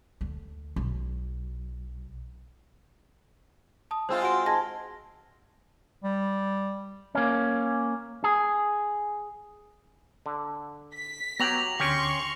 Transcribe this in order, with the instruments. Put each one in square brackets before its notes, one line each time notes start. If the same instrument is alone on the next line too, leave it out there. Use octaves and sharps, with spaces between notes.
[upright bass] D2
B1
[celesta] A5 D#6
[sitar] G#3 C4 F4 [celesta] C5
[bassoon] F#4 [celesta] C6 D7
[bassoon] G#2 [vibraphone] A5 [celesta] G#6 A#6
[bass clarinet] G3
[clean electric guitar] A#3 C#4
G#4
[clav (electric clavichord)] D3
[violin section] B6
[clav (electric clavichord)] F#3 G4 [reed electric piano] B3 G5 A#5 [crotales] A#6 F7 F#7
[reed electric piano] D2 D3 [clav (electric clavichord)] C#4 G4 [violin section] C6 C#6